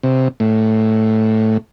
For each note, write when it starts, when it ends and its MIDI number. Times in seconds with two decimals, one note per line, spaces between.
0.03 0.28 48
0.40 1.58 45